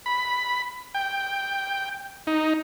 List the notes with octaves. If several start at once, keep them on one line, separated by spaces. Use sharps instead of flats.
B5
G5
D#4